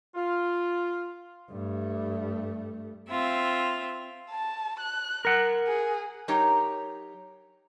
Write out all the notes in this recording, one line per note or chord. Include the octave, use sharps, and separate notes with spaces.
F4
G2 A3
C4 F4 E5
A5
F#6
A#4 F#5
G#4
F#3 D#4 G4 A#4 C#5